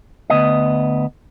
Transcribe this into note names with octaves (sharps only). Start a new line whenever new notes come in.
D2 B3 D#5